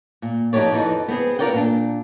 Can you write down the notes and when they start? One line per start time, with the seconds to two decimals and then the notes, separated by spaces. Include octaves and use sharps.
0.22 A#2
0.53 F2 D#4 G4 A#4 C#5 D5
0.72 F2 C3 E3 D#4 D5
1.08 B3 C4 G#4
1.39 F4 A#4 D5 F#5 G5
1.53 A#2 D4